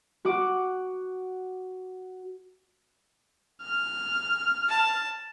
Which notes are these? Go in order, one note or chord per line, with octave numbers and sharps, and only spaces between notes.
F#4 F#5 D6
F6
A5